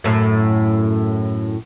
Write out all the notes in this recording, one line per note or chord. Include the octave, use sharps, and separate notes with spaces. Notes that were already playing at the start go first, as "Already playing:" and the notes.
F#2 A2